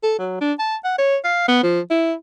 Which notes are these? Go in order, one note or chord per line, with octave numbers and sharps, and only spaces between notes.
A4
F#3
D4
A5
F#5
C#5
F5
B3
F3
E4